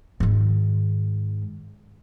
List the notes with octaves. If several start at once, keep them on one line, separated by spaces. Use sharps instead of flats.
G#2 D#3